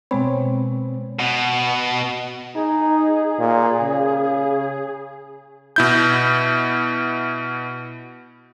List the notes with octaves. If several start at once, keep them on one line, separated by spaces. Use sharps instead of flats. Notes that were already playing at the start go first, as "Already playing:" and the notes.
B2 G#3 B3 C4 C#5 B5
B2
D#4 G#4
A#2
C#3
B2 E4 G6